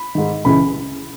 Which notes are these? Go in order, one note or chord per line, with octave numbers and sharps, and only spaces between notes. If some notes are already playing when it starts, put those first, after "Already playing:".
Already playing: B5
G#2 D#3
C#2 C#3 E3 B5